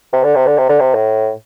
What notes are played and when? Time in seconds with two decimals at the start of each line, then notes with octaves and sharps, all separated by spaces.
0.13 C3
0.24 D3
0.36 C3
0.47 D3
0.58 C3
0.69 D3
0.80 C3
0.95 A2